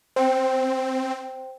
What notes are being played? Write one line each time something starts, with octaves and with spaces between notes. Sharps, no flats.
C4 C5 G5